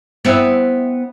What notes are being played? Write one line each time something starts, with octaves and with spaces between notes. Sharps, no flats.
B3 C4 E4